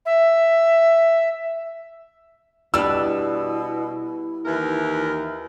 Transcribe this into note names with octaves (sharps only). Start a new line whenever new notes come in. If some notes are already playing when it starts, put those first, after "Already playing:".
E5
B2 G3 D4 E4 B4 E6
D#2 E3 A#4